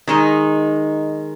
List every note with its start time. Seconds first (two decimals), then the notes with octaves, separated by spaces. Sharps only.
0.07 D#3 G#3 D#4